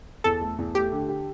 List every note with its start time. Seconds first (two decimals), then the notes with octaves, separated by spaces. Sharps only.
0.24 E2 A4
0.41 A3
0.58 E2
0.75 A3 G4
0.92 D3
1.09 G4